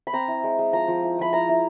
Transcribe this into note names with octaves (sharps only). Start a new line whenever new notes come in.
B5
C4 A#5
E4
G#3
G#3
F3 A#5
F3
E4
F3 B5
E4 A#5
E4